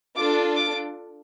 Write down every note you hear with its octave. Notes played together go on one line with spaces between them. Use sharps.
D4 F4 A4 D6
D6